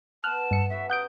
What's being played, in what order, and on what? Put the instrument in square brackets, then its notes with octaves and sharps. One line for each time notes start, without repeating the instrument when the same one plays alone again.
[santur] B3 F#5 [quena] A5 [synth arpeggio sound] F6 F#6
[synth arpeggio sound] G2 C#7 [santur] A4 D#5 E5
[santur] C#4 F#4 B4 [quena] E5
[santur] C#4 G4 A#5 [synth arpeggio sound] F#5 G6 D7 [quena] D#6